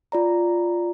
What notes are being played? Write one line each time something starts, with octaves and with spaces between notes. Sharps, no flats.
F4 D5 A#5